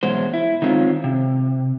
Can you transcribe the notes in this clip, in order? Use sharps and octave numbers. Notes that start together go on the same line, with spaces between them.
E2 B2 F#3 G#3 C5
E4
D#3 G#3 C4 C#4 F4
C3